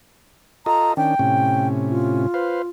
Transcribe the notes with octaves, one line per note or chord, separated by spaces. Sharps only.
F4 A4 D#5 A#5
D#3 C#4 D4 G5
A2 C3 C#4
F4
B4 C5 F5